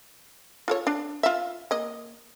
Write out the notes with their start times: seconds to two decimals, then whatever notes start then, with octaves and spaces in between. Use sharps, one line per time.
0.68 F4 A4 C#5
0.87 D4
1.23 F4 E5
1.71 A#3 D#5